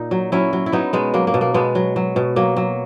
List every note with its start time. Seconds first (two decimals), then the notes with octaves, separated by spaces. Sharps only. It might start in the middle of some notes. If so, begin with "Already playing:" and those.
Already playing: A#2 D#4
0.11 F#3
0.32 F#3 C#4 E4
0.53 F#3
0.66 E4
0.72 F#3 B3 D#4
0.93 B2 G#3 B3
1.14 F#3 A#3
1.27 A#3
1.34 B2
1.41 A#3
1.54 B2 G#3 B3
1.75 F#3
1.96 F#3
2.16 B2
2.36 F#3 A#3
2.57 F#3